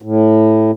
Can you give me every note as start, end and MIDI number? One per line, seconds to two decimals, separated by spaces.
0.02 0.71 45